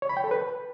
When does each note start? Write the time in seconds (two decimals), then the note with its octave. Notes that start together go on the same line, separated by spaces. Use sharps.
0.02 C#5
0.09 B5
0.17 G5
0.24 A4
0.31 B4